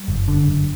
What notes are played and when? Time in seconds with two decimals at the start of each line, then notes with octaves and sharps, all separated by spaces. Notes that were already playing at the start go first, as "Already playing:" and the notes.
Already playing: G3
0.08 F#1
0.28 D3
0.47 F#1